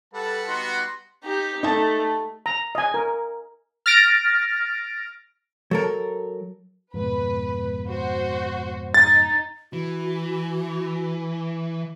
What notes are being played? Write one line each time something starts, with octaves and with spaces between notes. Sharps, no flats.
G3 A4 B4 F#5 A5
B3 D#4 F#4 C6
D#4 G4
A3 D#4 A5
A#5
D#5 G#5
A#4
F6 A6 A#6 D7
F#3 A4 A#4
F2 G#2 B2 B4
F#4 C5
D#4 A6
E3 F#4